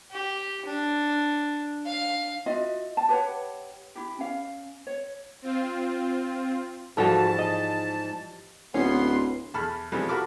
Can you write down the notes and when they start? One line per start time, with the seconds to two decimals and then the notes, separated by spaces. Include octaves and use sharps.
0.11 G4
0.65 D4
1.85 F5
2.46 F4 F#4 D#5 E5
2.97 A5
3.09 G4 B4 C#5 F#5
3.95 E4 G4
4.18 C#4 F5
4.87 C#5
5.42 C4 F4
6.97 G#2 E3 F3 G3 F#4 A4 A5
7.39 D#5
8.74 D1 B3 C#4 C6
9.54 E2 A5 B5 F6
9.92 E3 F3 G3 G#3 B3 C4
10.09 F#4 A#4 A5 B5 D6 F6